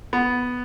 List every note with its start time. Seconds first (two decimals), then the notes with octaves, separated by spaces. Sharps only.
0.13 B3